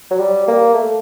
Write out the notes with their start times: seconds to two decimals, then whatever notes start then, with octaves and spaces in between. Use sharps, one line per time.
0.11 F#3
0.20 G3
0.48 A#3
0.74 A3